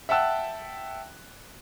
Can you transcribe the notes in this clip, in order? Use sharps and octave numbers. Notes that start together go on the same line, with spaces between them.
E5 F#5 G5 A5 E6 F#6